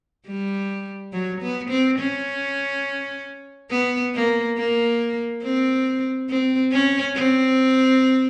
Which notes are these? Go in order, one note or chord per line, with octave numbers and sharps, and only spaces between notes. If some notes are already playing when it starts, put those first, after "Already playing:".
G3
F#3
B3
C4
C#4
B3
A#3
A#3
C4
C4
C#4
C4